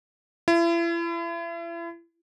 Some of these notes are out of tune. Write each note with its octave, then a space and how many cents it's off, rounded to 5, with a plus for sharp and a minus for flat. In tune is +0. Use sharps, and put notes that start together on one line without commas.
E4 +40